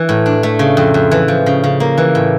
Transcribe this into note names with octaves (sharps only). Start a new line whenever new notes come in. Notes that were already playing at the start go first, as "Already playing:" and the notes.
Already playing: E3
A2
D4
A3
C#3
F2
F2
E3
F3
C#3
C#3
A#3
E3
A2